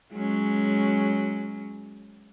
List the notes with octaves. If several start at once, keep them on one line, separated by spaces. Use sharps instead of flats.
F#3 G#3 C#4